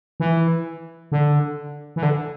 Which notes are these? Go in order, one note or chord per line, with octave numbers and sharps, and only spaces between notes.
E3
D3
E3
D3